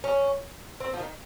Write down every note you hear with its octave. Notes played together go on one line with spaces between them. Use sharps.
C#4
C4
F3
D#3